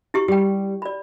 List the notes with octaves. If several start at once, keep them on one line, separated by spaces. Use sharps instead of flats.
E4 G4 C#6
G3 G4 G5
D5 B5